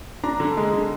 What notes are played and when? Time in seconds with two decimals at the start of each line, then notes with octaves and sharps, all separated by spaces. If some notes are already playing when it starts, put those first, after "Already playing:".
0.24 D4 A#5
0.40 D3
0.57 G#3
0.73 D3